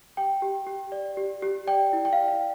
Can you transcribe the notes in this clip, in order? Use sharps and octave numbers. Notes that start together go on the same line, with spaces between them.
G4 G5
G4
G4
D5
G4
G4
D5 G5
E4
G5
F5
D5
F5